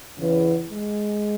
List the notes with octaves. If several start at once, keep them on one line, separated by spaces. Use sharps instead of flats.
E2 C#3 E3
G#3